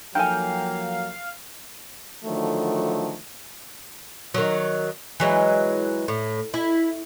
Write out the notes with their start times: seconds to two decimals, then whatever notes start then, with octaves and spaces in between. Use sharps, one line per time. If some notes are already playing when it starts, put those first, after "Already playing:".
0.15 F3 F#3 A#3 D#4 A4 F5 G5 G#5
2.25 D3 D#3 F3 F#3 A3
4.34 D#3 F#3
5.20 E3 F#3 G#3
6.08 A2
6.54 E4